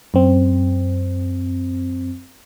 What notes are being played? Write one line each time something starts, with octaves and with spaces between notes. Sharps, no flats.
F#2 C4